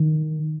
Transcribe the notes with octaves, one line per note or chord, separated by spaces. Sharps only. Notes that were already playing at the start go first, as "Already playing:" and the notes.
Already playing: D#3